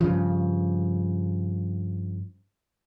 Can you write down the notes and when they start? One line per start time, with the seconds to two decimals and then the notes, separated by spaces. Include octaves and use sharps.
0.01 G2 C#3 F3